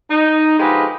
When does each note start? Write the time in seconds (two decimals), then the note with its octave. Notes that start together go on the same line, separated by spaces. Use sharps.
0.10 D#4
0.59 D3 F3 G#3 G4 G#4 B4